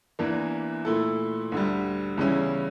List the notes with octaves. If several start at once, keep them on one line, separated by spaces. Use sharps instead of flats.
E2 E3 A#3 D4
A#2 A3 E4 A4
D2 D3 G3
E2 C#3 G3 C#4 E4